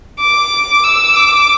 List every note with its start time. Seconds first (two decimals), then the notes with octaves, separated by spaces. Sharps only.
0.20 D6
0.84 E6
1.15 D6